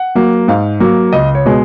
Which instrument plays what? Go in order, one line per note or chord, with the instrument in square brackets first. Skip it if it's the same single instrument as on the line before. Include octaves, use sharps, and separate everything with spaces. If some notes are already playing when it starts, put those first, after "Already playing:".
Already playing: [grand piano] F#5
F#3 A#3
G#2 F5
F#3 A#3
C#2 D#5
C#5
B2 G#3